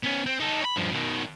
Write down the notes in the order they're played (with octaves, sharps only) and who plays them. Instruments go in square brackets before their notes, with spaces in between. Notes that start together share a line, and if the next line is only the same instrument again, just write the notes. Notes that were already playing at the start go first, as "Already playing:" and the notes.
[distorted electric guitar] B3 C#4
C4
D#4 A4
C#5 B5
G2 F3
B2 D#3